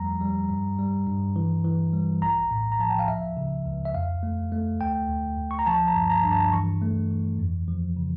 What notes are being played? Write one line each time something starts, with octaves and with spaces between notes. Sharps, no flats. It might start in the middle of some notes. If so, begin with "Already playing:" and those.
Already playing: F2 F3 G3 A3 A#5
G3
G2
G3
G2
E3
E3
G3
A#1 A#5
A2
A#5
F3 A5
G5
F5
C#2 E5
C#3
C#2
E5
F2 F5
A3
A3
D2 G5
D2
D2
C#6
A#5
F3 A5
A#5
G2
A#5
G2
A5
E3 C#6
A3
E3
F2
F3
C#3